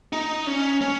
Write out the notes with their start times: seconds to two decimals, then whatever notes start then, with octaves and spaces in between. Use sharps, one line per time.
0.13 D#4
0.47 C#4
0.81 C#4